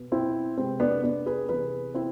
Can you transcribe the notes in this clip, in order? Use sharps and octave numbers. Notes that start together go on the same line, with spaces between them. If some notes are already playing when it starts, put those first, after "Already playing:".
Already playing: B2 B3
C4 E4
C3 G#3 B3 C4
B3 D4
B3 D4
G#4 B4
C3 E3 B3 G#4 B4
C4 E4